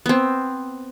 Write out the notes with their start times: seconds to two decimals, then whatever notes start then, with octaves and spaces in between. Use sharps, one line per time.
0.06 B3 C4